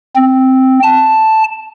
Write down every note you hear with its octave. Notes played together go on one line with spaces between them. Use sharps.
C4
A5